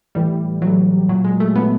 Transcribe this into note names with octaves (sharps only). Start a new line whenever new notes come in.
A2 E3 G3
A2 E3 F#3
A#2 F#3
G#3
A3
A#2 B3